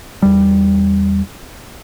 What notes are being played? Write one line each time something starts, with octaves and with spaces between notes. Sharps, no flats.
E2 G3